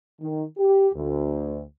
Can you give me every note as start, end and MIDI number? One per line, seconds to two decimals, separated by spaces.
0.21 0.44 51
0.58 0.89 67
0.95 1.61 38